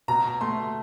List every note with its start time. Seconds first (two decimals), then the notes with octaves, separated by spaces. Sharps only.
0.08 B2 A#5
0.41 A3 C6